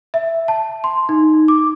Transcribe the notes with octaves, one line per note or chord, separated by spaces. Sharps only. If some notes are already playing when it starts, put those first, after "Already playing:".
E5
A5
C6
D#4
D6